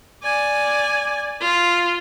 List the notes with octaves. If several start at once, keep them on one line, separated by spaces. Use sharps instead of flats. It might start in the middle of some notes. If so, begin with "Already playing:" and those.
D5 G#5
F4